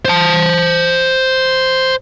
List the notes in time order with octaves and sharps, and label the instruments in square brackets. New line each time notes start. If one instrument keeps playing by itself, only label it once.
[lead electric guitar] C5 A5